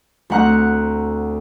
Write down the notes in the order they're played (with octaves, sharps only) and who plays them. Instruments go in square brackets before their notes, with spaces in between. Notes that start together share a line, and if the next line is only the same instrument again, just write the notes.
[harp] D2 C4 F#5 A#5 F#6